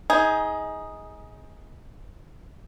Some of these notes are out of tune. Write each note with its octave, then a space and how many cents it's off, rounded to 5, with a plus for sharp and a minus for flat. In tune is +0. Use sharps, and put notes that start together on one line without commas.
D#4 +25 G#4 +0